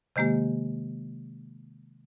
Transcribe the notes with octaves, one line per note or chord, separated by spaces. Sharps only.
C3 D#3 G#3 A#3 G4